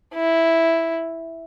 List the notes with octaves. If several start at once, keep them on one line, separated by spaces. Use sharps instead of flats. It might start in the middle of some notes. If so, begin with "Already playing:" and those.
E4